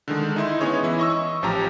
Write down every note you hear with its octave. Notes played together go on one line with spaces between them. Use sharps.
D3 D#3 G#3
D#4 E4 C6
B3 C#4 D#4 G#4 C#5
E3 E4
D#5 C#6 E6
A1 F3 C#4 G4 A#5